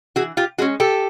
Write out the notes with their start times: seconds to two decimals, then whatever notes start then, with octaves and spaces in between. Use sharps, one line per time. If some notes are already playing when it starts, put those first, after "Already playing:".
0.16 E3 F#4 G#4
0.37 F4 G4
0.58 G#3 C#4 F#4 G#4
0.80 G4 A4